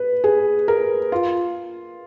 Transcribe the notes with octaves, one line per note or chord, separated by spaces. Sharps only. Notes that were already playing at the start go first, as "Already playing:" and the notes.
Already playing: B4
G#4
A#4
F4